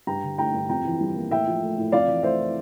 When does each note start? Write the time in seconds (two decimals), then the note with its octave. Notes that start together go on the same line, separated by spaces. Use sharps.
0.07 G2 G5 A#5
0.23 D3
0.38 A3 G5 A#5
0.54 G2
0.69 F2 G5 A#5
0.85 E3
1.01 G3
1.16 A#3
1.31 A2 E5 G5
1.47 F3
1.63 A3
1.78 A2
1.92 F2 D5 F5
2.08 E3
2.23 A3 C5 E5